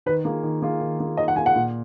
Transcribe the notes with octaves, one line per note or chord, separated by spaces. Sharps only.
D#3 B4
A#3 F4 G#4
D#3
A#3 F4 G#4
D#3
A#3 F4 G#4
D#3 D#5
F#5
A#3 F4 G#4 G#5
F#5
A#2